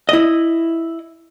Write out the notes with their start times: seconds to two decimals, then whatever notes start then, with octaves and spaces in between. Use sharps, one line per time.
0.09 E4 D#5